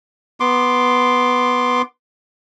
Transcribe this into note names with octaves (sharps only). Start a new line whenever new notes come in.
B3 C6 D6